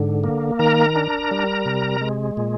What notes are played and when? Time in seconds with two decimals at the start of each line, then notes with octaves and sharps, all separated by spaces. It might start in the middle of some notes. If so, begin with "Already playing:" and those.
Already playing: G#2 D3
0.24 A#3
0.59 D#3 A#4 A#5
0.96 D4
1.31 G3
1.66 C3
2.01 G#3
2.37 A#2